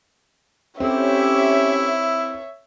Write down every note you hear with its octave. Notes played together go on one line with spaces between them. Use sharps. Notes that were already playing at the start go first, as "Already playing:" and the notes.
C4 C#4 E4 G4 A4 C#5 E5